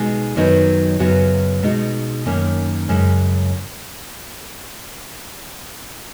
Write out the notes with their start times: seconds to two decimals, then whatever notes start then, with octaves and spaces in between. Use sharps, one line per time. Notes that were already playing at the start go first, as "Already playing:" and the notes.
Already playing: B2 G#3 D#4 F#4
0.36 F#2 D#3 F#3 B3 D#4
0.99 F#2 C#3 F#3 B3 F#4
1.63 B2 G#3 D#4 F#4
2.26 F#2 D#3 A#3 C#4
2.88 F#2 C#3 G#3 C#4